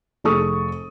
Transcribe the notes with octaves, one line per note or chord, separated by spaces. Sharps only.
F1 G#4 A4 C#6 D#6